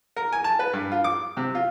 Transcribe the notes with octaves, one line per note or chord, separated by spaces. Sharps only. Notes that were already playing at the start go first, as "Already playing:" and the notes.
A#4
G#5
A5
B4
G2
F4
D6
C3
F4